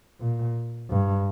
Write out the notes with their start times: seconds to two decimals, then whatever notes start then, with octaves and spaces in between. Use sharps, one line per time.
0.21 A#2
0.90 G2